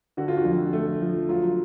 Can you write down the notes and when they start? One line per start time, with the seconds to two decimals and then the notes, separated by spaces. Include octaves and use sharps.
0.17 D3 F#4
0.28 F4
0.37 F#4
0.45 F2
0.73 A3
1.01 F3
1.29 F#3 F4